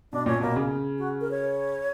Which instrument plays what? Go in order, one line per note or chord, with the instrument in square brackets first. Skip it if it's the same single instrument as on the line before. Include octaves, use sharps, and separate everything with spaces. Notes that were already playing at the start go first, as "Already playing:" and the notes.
[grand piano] B2 [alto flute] D4
[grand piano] A#2 [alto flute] C#4
[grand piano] B2 [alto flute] A#3
[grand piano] C#3
[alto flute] F#4
A#4
C#5